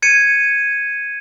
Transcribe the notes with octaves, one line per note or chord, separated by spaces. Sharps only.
G#6 C#7 D#7